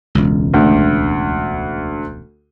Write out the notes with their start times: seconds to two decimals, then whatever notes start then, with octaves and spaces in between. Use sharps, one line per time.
0.15 E1 C#2
0.54 D2